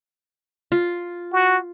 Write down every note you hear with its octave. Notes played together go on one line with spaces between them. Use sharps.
F4
F#4